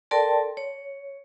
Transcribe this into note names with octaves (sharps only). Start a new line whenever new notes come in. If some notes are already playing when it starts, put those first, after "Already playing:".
A4 A#4 D5 G5 A5 C6
C#5